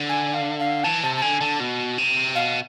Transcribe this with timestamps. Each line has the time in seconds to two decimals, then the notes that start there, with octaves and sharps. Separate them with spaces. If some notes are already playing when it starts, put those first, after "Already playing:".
Already playing: D3
0.09 G#5
0.34 F5
0.59 F5
0.84 E3 A5
1.03 C3 A5
1.16 A5
1.22 D3 G#5
1.41 D3 A5
1.60 B2
1.98 C3
2.35 B2 F5